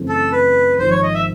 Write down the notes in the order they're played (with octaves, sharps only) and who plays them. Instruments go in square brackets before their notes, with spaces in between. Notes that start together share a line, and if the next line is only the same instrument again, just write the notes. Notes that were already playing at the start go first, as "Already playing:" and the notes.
Already playing: [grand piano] F#2 C#3 E3 A3 C4
[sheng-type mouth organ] A4
B4
[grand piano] G#1 G#2 F3 [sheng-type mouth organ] C5
[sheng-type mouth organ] C#5
D#5
E5